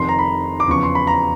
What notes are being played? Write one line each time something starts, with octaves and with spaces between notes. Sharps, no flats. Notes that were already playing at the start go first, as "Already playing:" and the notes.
Already playing: F1 F2 C3 D#3 C6
A#5
B5
D6
E2 C#3 F3 C#6
C6
B5
A#5